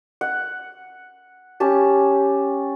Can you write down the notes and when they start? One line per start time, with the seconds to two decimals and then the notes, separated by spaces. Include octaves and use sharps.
0.21 F#5
1.60 C#4 G4 A5